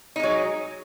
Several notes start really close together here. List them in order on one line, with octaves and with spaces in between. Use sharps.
D#4 G#3 F#3